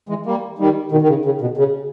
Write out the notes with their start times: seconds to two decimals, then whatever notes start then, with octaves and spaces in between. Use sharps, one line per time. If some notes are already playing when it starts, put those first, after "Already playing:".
0.09 E3 G#3
0.26 G3 A#3
0.58 D#3 G3
0.92 B2 D#3
1.02 D#3
1.09 C#3
1.25 C#3
1.41 B2
1.57 C#3